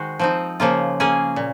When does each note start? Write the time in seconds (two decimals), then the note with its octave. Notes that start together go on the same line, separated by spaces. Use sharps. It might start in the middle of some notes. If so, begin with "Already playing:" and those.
Already playing: D#3 G#3 F#4 C5
0.19 F3 C4 D#4
0.60 C#3 F3 A#3 F4
1.00 A#3 C#4 G#4
1.36 A#2